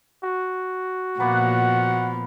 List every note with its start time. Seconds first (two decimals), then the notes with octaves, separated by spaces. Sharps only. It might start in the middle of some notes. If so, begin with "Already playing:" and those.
0.23 F#4
1.20 A#2 F3 A#3 B3 B4 F#5